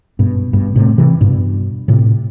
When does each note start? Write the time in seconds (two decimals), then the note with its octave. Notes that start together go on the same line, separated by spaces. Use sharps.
0.19 G2 B2
0.53 G2 B2
0.75 A2 C3
0.98 C3 E3
1.21 G2 B2
1.88 A2 C3